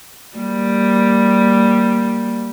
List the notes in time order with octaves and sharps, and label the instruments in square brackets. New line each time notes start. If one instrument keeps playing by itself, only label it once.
[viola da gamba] G3 A#3